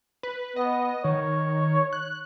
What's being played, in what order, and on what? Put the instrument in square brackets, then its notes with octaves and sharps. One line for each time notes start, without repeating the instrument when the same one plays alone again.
[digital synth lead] B4
[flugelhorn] B3 [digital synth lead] D#5
[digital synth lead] D#3 [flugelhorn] C#5
[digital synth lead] F#6